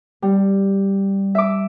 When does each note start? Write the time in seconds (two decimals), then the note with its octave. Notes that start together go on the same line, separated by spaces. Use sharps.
0.22 G3
1.35 E5 D6